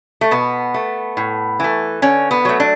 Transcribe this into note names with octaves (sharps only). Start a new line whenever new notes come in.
A3
B2 B3
A3
A2
E3 A3
D3 C#4
B3
F#3 A3
D4